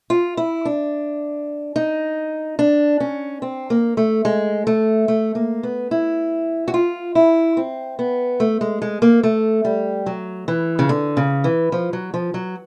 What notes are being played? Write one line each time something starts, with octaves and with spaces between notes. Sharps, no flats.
F4
E4
D4
D#4
D4
C#4
C4
A#3
A3
G#3
A3
A3
A#3
B3
E4
F#4
F4
E4
C4
B3
A3
G#3
G#3
A#3
A3
G3
F#3
E3
C#3
D3
C#3
E3
F3
F#3
F3
F#3